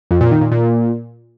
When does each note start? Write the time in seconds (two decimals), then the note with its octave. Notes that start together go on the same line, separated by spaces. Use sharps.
0.11 F2
0.21 A#2
0.31 D#3
0.41 A#2
0.51 A#2